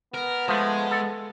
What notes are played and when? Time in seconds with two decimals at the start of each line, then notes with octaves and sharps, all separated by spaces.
0.14 B3 A#4
0.48 F3 G#3 A3
0.91 A4